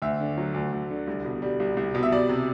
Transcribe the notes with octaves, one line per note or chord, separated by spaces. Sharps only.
D2 E5
D3
F#3
D2
D2
D3
C2
B2
G3
C2
C2
B2
E5
G3 D5
C3